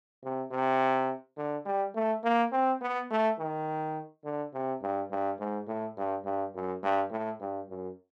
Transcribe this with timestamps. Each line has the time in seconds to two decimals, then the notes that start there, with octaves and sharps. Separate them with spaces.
0.23 C3
0.51 C3
1.37 D3
1.66 G3
1.95 A3
2.24 A#3
2.52 C4
2.81 B3
3.10 A3
3.39 D#3
4.25 D3
4.54 C3
4.82 G2
5.11 G2
5.39 G#2
5.68 A2
5.97 G2
6.25 G2
6.54 F#2
6.83 G2
7.11 A2
7.40 G2
7.69 F#2